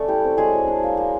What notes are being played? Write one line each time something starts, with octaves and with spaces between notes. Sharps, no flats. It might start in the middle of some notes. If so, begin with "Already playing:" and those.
Already playing: A3 C#4 A4 D5
G3 E4 G4
C4
F#3 G#3 G#4
F#3
D4
A#3
A#3